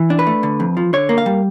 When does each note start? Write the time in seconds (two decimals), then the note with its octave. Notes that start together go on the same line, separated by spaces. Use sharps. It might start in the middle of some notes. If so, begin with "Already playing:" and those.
Already playing: E3
0.10 D4
0.19 B4
0.27 A3
0.43 D3
0.60 F2
0.77 F3
0.93 D3 C#5
1.09 A#3
1.18 F5
1.26 G3